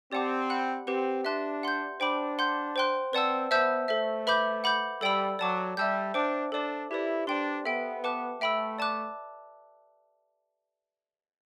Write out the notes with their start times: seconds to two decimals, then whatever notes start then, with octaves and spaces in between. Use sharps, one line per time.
0.12 C4 G4 D5 F#5 A5 D6
0.50 F#5 B5 F#6
0.87 C4 G4 B4 F#5
1.25 D4 E5 A5 C6 F#6
1.63 F#5 C6 G6
2.00 D4 C5 G5 B5 D6
2.39 F#5 C6 G6
2.76 C5 G5 C6 F#6
3.13 C4 B4 D5 F#5 A5 E6
3.51 B3 C5 E5 A5 E6 G6
3.88 A3 A4 C5 E5
4.27 B4 E5 B5 D6 G6
4.64 F#5 B5 D6 G6
5.01 G3 A4 D5 G5 B5 E6
5.39 F#3 D5 A5 D6
5.77 G3 E5 A5 E6 G6
6.14 D4 C5 G5 D6
6.52 D4 A4 D5 A5 D6
6.90 E4 G4 B4 D5
7.27 D4 C5 G5 C6
7.65 B3 A4 E5 G5
8.04 B4 F#5 A5 D6 F#6
8.41 A3 E5 G5 B5 E6
8.79 D5 A5 D6 F#6